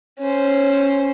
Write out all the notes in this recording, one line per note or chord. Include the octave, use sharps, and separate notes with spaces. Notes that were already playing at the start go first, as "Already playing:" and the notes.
C#4 C5